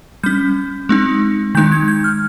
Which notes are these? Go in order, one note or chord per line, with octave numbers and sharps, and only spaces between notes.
G3 C#4 G6
G#3 C4 D#4
D#3 G#3 D#4 G6
G#6
G6
F6